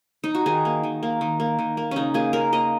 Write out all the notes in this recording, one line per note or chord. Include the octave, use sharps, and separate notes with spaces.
D#4
F#4
D#3 G#4
A#3
D#3
A#3
D#3
A#3
D#3
A#3
C#3 C#4 D#4
A#3 G#4
C#3 A#4
A#3 D#5